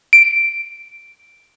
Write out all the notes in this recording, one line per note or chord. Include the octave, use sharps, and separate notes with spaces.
D7